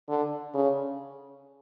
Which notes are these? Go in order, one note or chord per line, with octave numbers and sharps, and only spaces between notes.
D3
C#3